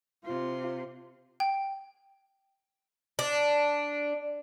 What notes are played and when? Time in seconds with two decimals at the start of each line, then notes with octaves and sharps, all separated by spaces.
0.25 C3 F4 C5
1.40 G5
3.19 D4